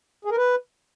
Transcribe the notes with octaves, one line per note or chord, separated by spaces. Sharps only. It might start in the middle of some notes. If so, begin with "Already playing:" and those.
G#4
A#4
B4